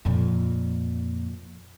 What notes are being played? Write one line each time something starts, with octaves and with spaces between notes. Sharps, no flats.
F2 A#2